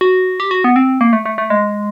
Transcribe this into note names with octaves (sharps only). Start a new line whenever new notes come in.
F#4
G4
F#4
B3
C4
A#3
A3
A3
A3
G#3